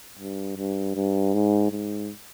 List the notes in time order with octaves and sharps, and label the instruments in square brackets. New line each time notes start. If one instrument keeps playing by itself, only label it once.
[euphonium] G2
G2
G2
G#2
G#2